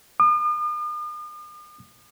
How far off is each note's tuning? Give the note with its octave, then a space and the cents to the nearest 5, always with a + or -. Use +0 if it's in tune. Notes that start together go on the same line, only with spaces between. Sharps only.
D#6 -45